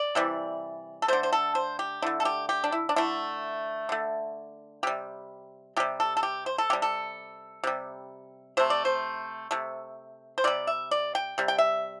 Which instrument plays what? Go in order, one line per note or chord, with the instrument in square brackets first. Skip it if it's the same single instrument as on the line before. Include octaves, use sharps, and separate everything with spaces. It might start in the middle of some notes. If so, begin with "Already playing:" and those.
Already playing: [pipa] D5
C3 E3 G3
A4
D3 A3 C5
C5
A4
C5
G4
D3 A3 E4
A4
G4
G4
D4
E4
D4
D3 A3 E4
D3 A3
C3 G3 G4
C3 G3 G4
A4
A4
G4
C5
A4
C3 G3 G4
A4
C3 G3
C3 A3 C5
D5
C5
C3 A3
C5
C3 G3 D5
E5
D5
G5
C3 G3
G5
E5